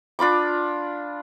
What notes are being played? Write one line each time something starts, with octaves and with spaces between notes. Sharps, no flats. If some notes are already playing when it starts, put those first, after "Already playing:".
D4 F4 B5 D6